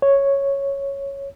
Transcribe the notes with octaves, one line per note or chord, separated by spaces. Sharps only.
C#5